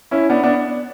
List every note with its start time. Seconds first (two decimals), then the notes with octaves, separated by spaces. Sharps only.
0.11 C#4 E4
0.30 B3 D4
0.43 B3 D4